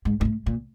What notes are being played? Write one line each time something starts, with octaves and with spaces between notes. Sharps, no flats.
G#2
G#2
A2
A#2